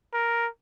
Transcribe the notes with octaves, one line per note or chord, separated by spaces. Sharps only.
A#4